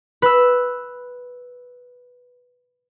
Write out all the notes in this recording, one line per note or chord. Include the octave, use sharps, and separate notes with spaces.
B4 E6